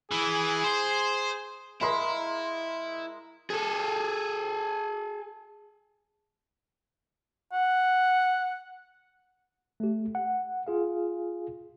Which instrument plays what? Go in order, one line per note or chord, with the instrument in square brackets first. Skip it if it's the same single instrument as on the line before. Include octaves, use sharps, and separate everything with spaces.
[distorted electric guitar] E3 [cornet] G#4
[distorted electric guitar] C5
[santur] G#3 A#4 F5 [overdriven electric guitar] E4 [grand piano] B5 C6
[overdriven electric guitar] G#4 A4
[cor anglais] F#5
[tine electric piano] A3 G4
F#5
F4 G#4 F5